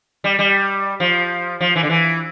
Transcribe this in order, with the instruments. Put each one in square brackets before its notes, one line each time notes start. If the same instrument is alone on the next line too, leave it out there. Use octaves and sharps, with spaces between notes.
[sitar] G3
G3
F3
F3
E3
D3
E3